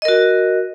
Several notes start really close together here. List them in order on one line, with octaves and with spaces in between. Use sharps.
D#5 A#4 F#4